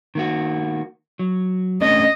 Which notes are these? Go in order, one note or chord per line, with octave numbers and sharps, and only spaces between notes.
D#3 A#3 F#4
F#3
A3 C#4 D4 D#5